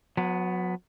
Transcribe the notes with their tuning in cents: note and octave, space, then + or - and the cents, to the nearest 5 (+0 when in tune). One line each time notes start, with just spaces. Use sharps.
F#3 -30 B3 +10